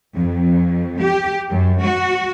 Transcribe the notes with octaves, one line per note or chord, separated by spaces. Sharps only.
F2
G4
F#2
F#4